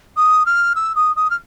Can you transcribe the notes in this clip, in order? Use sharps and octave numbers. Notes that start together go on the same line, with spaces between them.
D#6
F6
E6
D#6
D#6
F6